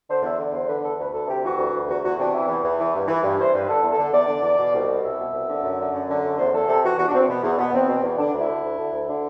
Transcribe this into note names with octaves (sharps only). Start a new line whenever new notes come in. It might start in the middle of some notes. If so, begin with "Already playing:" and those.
D3 C5
E2 E5
D3 D5
E2 C5
D3 B4
E2 A4
D2 B4
D2 A4
C3 G4
E3 F#4
D2
D2
E2 F#4
E2 F#4
C3 D4
E3 E4
E2
E2
E3
G2
E3
G2
E3 C5
G2 B4
D3 A4
E2
A4
D3
E2 D5
D3
E2
B2
C2
B2
C2 E5
B2
C2
D3
F#2
D3
F#2
D3
F#2
E2 C5
E2 A4
C3 A4
E3 F#4
E2 F#4
D4
E2 C4
B2 B3
E2
B2 B3
E2 C4
B2
E2
D3 D4
D2
E4
D3
D2
D3
D2
D3